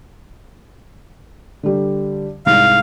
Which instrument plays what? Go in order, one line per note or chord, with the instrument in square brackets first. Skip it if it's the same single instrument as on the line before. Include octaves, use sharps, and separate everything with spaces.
[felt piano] D3 G3
[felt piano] C2 G#2 [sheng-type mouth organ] F5